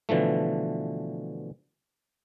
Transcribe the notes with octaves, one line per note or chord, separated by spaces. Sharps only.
B2 D3 E3 F3 A3